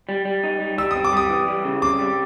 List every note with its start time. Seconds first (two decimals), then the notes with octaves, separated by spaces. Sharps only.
0.09 G3
0.25 G3
0.43 D#4
0.60 G3
0.78 G3 E6
0.91 D#6
0.95 C4
1.04 D6
1.13 G3 D#6
1.30 E3
1.47 G3
1.65 C#3
1.82 C4 D6
1.99 G3